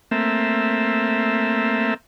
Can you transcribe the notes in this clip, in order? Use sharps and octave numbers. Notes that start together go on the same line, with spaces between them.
A3 A#3 C4 E5